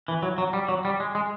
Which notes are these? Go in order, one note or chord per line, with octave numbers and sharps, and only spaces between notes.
E3
F#3
F#3
G3
F#3
G3
G#3
G#3